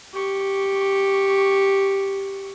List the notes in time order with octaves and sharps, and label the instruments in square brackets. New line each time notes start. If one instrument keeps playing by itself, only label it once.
[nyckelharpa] G4 C#6